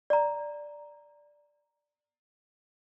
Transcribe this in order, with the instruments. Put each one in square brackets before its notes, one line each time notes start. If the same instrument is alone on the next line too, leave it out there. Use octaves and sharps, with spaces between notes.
[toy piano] D5 A#5